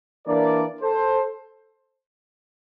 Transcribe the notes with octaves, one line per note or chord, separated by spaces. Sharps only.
E3 A#3 D4 A#4 D5
A4 C5